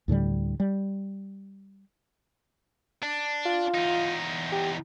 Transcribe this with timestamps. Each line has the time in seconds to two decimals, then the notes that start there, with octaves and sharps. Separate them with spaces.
0.08 D2 A2 D3 G3
0.60 G3
3.03 D4
3.46 F4
3.75 E2 D#4
4.52 G4